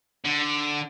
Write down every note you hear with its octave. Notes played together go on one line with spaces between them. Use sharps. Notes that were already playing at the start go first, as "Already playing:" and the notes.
D3